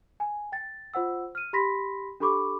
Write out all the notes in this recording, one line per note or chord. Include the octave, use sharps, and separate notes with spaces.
G#5
G5 A6
F4 C5 F#5 E6
F6 D#7
G4 B5 C6 A#6 B6
D4 G4 A4 B5 C#6 D6